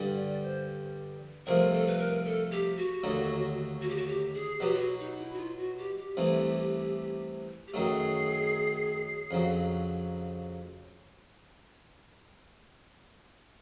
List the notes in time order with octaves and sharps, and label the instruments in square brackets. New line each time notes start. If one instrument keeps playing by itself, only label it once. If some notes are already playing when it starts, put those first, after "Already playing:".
Already playing: [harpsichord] G2 D3 G3
[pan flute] D5
C5
[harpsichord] C2 C3 F3 A3 [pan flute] A#4
[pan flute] A4
B4
A#4
A4
G4
F#4
[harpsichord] D#2 D3 F#3 A3
[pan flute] F#4
G4
F#4
G4
G#4
[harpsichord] B2 F#3 B3 [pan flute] G4
[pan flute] F4
F#4
D#4
E4
F#4
F4
F#4
G4
G4
[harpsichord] C2 C3 E3 A3
[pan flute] G4
[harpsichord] F#2 D#3 F#3 A3 [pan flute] G#4
[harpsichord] F2 C#3 F#3